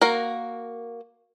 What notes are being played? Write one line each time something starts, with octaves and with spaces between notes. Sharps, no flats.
A#3 F#4 A#4